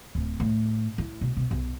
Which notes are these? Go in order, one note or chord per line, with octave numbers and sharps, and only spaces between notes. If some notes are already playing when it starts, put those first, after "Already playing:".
D1
A2
E4
B2
B2
B1